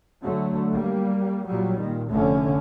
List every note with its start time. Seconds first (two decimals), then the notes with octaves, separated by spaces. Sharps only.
0.23 D3 F#3 A3
0.72 G3 A#3
1.46 A#2 F#3 G3
1.80 A#2 D#3
2.10 F1 D3 A3 C#4